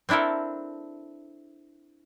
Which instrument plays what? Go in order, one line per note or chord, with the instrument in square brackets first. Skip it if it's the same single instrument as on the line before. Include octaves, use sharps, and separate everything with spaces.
[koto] C4 D4 E4 A4 A#4